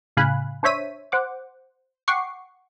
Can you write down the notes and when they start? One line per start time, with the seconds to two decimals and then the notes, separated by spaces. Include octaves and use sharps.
0.17 A2 C#3 F5 G#5 B5 F#6
0.63 D4 C5 C#5 E5 B6 D#7
1.12 C5 F#5 D6
2.08 F#5 G5 C#6 D6 C7